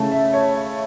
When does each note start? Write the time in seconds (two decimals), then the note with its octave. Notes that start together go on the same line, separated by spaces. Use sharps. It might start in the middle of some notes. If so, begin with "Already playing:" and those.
Already playing: C#3 A3 C#4 E4 A5
0.11 E5
0.33 C#5
0.55 E5